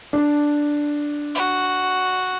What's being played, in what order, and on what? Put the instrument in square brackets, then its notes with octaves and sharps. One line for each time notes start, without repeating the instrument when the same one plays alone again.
[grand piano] D4
[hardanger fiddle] F#4